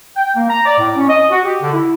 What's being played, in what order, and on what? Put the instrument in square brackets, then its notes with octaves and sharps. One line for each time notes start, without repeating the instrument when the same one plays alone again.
[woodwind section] G5
A#3
A#5
D5
A2
C#4
D#5
F#4
G4
D3
E4